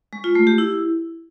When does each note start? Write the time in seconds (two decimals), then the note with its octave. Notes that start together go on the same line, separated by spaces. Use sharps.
0.13 G#3
0.24 F4
0.35 A3
0.47 G4
0.58 E4